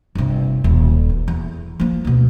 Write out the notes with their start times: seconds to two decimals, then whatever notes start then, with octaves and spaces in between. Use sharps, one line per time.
0.15 G1 C3
0.64 D#1
1.09 E3
1.28 E2
1.80 F3 A#3
2.05 D2 B2